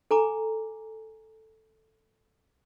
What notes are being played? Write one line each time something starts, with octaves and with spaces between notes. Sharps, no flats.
A4 G#5 A#5 D6